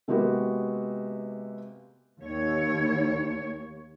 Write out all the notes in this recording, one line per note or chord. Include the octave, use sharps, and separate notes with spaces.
C3 G#3 A#3 B3 F#4 G4
D#2 C#5